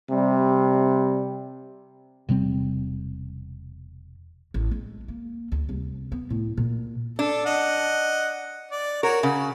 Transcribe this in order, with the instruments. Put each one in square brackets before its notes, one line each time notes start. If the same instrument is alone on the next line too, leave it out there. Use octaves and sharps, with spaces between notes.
[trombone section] C3 G3
[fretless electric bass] E1 C3 G3 C4
[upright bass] A1
G#3
A#3
D2
C2
B3
A2
A#2
[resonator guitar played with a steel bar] D4 [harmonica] A4
[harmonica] D#5 F#5
D5
[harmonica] F#4 C#5 [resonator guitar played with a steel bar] A#4
[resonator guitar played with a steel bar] C#3 [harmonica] F#4